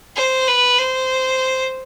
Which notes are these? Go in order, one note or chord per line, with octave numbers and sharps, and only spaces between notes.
C5
B4
C5